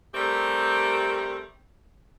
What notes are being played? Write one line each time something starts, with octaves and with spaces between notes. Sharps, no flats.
G3 A3 C4 G4 A#4